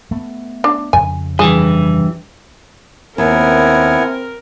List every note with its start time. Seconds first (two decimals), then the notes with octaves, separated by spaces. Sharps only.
0.11 A3 B3
0.64 D4
0.93 F2 C#3 G#5
1.39 G2 E3 G#4
3.18 D#2 B3 C4 E4 A#4 G#5